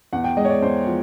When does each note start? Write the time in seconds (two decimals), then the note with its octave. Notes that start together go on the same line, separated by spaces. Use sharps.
0.13 E2 F#5
0.24 G5
0.37 G#3 D#5
0.45 C#5
0.50 D5
0.62 E2 C5
0.86 F3